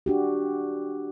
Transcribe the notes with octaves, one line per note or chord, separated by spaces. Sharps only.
D4 F#4 G4